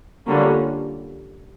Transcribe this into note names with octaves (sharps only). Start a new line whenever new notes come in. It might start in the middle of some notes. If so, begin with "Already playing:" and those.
D3 G3 A#3 C#4 F4